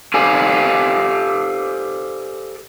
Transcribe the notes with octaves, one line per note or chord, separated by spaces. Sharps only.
G4 A4 C5 D5 F5 G#5